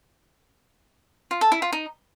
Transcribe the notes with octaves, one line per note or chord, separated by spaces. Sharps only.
F4
A4
E4
F4
D#4